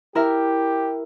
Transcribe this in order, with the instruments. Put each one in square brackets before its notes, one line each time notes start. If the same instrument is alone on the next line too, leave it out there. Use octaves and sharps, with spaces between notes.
[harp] E4 A#4 E5 [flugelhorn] G4